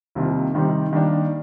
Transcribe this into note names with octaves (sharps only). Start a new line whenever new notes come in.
C2 C3 D#3 A#3 F4
C3 D#3 G3 C4 D#4
D#3 G3 A#3 D4